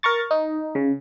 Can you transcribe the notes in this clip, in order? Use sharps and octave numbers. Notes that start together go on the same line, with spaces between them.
A#4 A#5 C#6 A6
D#4
C#3